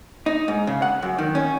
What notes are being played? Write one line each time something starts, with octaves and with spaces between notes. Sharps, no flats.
D#4
G#2
C#3
F#5
F#2
D#3
C#4